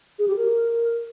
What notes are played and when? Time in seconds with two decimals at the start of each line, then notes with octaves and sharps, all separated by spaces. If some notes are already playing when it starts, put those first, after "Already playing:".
0.19 G#4
0.28 G4
0.37 A#4